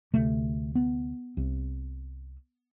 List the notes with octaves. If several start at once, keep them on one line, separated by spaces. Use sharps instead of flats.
D2 C3 A3
B3
C2 C3